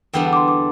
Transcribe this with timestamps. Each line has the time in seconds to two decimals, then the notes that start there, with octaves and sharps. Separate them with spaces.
0.13 E2 D3 G3 B3 D4 G5
0.25 F#5
0.33 D6
0.36 C6
0.48 D6